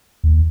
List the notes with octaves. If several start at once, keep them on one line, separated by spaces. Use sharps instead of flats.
D#2